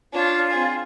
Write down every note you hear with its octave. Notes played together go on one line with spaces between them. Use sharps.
D4 F4 C#5
C4 G#4